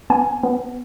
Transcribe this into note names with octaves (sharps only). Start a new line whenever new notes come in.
B3 G#5
B3